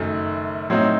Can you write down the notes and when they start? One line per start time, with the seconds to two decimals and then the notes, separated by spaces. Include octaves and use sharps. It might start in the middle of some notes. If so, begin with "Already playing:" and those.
Already playing: F#1 F#2 D#3 A3
0.70 A2 F#3 C4 D#4